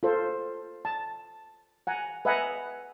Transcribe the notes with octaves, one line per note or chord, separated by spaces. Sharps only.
F4 A4 C5
A5
F#5 G#5 A#5
B4 D#5 E5 F#5 G#5 A#5